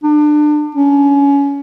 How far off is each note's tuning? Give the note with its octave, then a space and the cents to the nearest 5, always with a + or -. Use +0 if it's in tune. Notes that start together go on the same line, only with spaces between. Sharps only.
D4 +25
C#4 +25